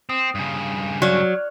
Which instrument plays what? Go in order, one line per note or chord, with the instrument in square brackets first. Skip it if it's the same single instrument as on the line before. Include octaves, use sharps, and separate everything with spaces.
[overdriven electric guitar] C4 [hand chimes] D#6
[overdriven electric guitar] G2 C#3
[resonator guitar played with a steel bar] F#3 [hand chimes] D5 F6 F#6